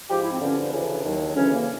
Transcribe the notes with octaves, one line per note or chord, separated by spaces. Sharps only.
G#2 F3 G4
E4
C4
G2 D3 F3 C#4
D4
D2 C#3 E3
D#2 D#3 F#3
D2 C#3 E3 C#4
A#3